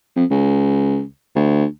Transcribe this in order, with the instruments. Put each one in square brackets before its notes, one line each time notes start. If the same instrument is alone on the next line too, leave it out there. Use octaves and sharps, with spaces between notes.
[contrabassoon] F2
C#2
D2